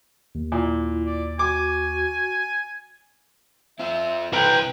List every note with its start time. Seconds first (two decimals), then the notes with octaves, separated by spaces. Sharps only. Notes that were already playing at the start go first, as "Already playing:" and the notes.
0.35 D#2
0.52 A#2 E4
1.06 D5
1.39 F#4 G#5 D6
3.79 C4 F4 E5
4.33 C3 E3 B4 G5 A#5